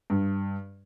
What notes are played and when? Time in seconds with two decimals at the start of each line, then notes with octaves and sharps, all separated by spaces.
0.10 G2